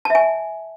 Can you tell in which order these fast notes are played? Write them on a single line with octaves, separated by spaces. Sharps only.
A5 E5 G#5